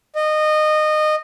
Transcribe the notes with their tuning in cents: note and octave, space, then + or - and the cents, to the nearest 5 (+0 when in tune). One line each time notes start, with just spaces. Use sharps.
D#5 -20